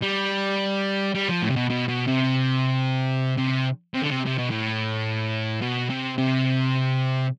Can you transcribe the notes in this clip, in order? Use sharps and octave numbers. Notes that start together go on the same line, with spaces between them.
G3
G3
F3
A2
C3
B2
B2
B2
C3
C3
C3
D3
C3
C3
B2
A2
B2
C3
C3